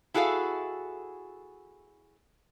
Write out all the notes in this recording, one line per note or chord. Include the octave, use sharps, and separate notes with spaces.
E4 F#4 G#4 A4 F5